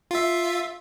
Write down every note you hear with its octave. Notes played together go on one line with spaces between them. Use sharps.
F4 E5